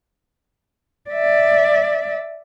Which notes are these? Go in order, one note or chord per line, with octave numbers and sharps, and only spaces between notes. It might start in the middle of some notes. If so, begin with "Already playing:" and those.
D5 E5